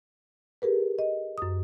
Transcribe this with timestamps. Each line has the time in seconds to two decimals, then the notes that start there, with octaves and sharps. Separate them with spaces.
0.62 G4 G#4 A#4 B4
0.99 D#5
1.38 F#2 D#6